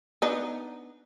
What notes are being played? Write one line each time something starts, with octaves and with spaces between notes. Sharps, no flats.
B3 D4 D#4